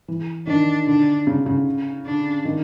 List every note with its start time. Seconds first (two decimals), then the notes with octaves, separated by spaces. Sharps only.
0.08 E3
0.47 D#3 D4
0.87 D3 D4
1.27 C#3
1.46 C#3
2.05 D3 D4
2.45 D#3